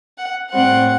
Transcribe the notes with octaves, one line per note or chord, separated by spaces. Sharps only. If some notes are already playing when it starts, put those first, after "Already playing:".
F#5
A2 G3 C4 F#5